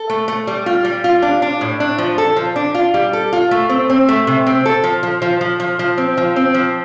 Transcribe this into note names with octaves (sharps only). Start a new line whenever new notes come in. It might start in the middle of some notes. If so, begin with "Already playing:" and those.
Already playing: A4
A3
A3
G3
F4
G3
F4
D4
D4
A2
D4
F3
A4
F3
D4
F4
G3
A4
F4
A3
C4
C4
A3
C3
C4
A4
F3
F3
F3
F3
F3
F3
C4
F3
C4
F3